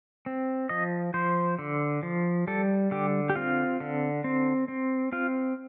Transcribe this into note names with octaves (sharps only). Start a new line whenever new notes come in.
C4
F3 D#5
F3 C5
D3
F3
G3 A4
D3 G4
G4
C4 F4
D3
C4
C4
C4 F4